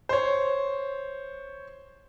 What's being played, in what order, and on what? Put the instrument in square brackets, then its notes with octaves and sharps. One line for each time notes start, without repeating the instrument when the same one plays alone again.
[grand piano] C5 C#5